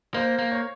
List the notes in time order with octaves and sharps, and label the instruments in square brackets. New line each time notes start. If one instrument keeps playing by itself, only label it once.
[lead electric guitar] A#3 [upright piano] C5
[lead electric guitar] A#3
[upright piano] C#5